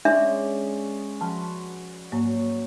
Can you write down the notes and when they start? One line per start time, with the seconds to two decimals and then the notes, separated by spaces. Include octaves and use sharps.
0.05 G#3 C#4 D4 D5 E5
1.21 F3 F#4 B4 A5 C6
2.12 G#2 F#3 A#3